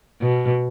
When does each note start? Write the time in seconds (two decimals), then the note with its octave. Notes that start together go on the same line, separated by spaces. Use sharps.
0.22 B2